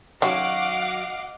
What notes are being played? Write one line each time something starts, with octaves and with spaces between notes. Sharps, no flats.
D#3 F#3 C#4 F#4 D#5 F5 F#5 D6